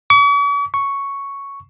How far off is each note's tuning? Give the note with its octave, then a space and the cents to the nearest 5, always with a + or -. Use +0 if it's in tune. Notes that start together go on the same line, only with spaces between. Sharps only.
C#6 +45
C#6 +0